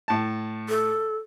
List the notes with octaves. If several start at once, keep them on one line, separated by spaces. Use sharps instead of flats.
A2 A5
A4